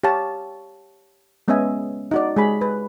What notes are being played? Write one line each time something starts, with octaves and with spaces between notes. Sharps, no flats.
G4 C#5 F5 A5
G#3 B3 C#4 D#5 E5 G#5
D#4 F#4 D5
G#3 G4 G#4 C#5 B5
B4